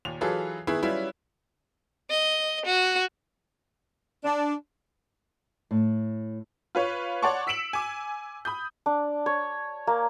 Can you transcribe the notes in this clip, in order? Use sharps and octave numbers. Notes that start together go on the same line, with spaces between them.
D#2 A#2 F7
E3 F#3 F4 G#4 A4 B4
D#3 B3 E4 G#4 B4
F#3 G3 C#4 E4 F4 B4
D#5
F#4
D4
A2
F4 B4 C#5
C#5 D5 F#5 A5 C6 C#6
E6 B6 C#7 D7 E7 F#7
G#5 D6
B5 D#6 G6
D4
C#5
A#3